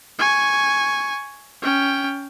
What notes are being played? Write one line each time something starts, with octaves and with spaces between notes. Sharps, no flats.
G#5 C#6
C#4 G5